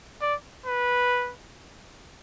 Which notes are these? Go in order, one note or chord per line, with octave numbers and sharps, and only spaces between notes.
D5
B4